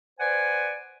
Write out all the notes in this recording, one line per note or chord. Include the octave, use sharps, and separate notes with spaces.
B4 C5 D5 F#5 G#5